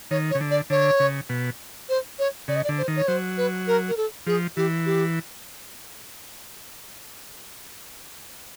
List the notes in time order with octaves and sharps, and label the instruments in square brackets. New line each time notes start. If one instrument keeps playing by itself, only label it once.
[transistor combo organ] D#3 [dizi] C#5
[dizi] C#5
[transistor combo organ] C#3
D3
[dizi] D5
[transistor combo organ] D3 [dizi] C#5
[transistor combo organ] C#3
B2
[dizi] C5
C#5
[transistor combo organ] C#3 [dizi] D5
[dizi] D#5
D5
[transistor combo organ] D3
[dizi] C5
[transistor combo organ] D#3
[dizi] C#5
[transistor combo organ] F#3 [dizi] C5
[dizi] B4
A#4
A#4
A4
[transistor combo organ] F3 [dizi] G#4
[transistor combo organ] E3 [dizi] G4
[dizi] G4